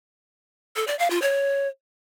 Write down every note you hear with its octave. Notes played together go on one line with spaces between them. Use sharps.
A4
D5
F5
F4
C#5